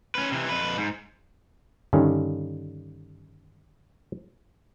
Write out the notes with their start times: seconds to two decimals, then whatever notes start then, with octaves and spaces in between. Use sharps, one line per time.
0.15 C#4 B4
0.32 C3 E3
0.49 F2 B4
0.78 G#2
1.93 G2 D3 D#3 C#4